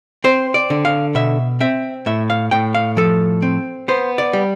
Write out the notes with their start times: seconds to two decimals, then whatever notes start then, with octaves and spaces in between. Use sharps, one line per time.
0.24 C4 C5
0.54 D5
0.70 D3
0.85 F5
1.15 B2 E5
1.60 C4 E5
2.06 A2 E5
2.30 F5
2.51 A2 G5
2.74 F5
2.97 F3 A4
3.42 C4
3.88 B3 C5
4.18 D5
4.33 G3